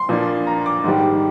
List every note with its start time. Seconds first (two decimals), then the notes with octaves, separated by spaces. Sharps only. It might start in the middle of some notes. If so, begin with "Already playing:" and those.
Already playing: C6
0.09 A#2 F3 A#3 D4
0.47 A#5
0.66 D6
0.84 G#2 D#3 G3